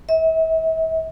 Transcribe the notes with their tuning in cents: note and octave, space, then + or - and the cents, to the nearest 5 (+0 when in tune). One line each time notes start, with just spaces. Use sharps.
E5 -40